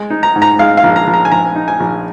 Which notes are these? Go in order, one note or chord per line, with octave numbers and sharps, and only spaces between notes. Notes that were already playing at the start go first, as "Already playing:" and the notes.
Already playing: G#3
D#4
A#5
G#2
A#5
G#3 F5
F5
A#1
A#5
A#1
A#5
G#5
A#1 A#5
D#4
G#5
A#1